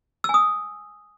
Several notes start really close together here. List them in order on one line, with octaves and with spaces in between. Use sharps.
E6 G#5 D#6